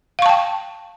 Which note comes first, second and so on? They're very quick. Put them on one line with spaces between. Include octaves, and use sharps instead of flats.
F5 C#6 A5 G5